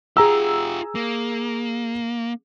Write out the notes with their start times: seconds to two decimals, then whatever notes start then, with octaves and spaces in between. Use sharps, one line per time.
0.17 F4 G4 G#4 A#5 E6
0.95 A#3